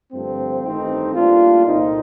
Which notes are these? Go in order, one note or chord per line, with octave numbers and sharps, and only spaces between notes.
G2 D3 F3 A3 C4
A1 G2 D#3 A3 C4 D#4
A2 G3 A#3 D4 F4
C2 A#2 A3 C4 D#4